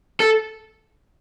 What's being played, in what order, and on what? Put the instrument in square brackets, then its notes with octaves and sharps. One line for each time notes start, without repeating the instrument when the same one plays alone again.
[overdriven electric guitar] A4